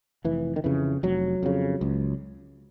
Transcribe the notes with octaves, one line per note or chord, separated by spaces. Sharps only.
F1 E3
D#3
F2 C#3 E3
F1 F#3
F2 C#3
C#2